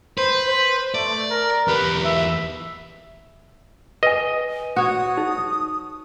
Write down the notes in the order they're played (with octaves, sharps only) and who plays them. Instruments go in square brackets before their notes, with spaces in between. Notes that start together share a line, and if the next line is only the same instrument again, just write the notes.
[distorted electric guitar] B4 [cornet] C5
[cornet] C5
[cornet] A3 [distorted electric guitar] D5
[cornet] A#4
[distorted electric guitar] E2 G4 [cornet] B4
[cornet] E5
[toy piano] B4 G#5 [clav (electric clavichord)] D#5
[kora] F#4 C#5 [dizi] D#6
[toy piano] D#4